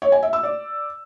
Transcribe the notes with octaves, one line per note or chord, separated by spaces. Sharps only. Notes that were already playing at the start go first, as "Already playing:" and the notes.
C#5
G#5
E5
E6
D5